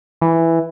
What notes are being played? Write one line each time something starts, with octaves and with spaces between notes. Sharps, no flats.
E3